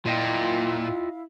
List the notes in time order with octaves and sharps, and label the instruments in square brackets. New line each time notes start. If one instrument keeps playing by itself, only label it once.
[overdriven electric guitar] A#2 [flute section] E4 F5 [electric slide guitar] F4 D#5 G5